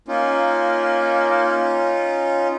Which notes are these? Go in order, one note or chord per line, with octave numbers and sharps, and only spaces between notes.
A#3 C#4 D#4 F4